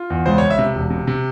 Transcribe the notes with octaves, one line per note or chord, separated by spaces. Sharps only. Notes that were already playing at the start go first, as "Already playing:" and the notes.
Already playing: F4
E2
C#2 C5
C#2 C#5
E5
C3
E1
C3
C3